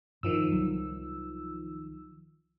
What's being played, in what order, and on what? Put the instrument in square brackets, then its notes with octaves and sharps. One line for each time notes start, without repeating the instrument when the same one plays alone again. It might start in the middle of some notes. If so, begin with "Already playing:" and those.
[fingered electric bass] G2 [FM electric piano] D#3 F3 E6
[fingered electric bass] C2 F#3